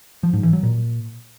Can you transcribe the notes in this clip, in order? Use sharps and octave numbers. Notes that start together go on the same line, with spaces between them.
F3
G#2
E3
F#3
A#2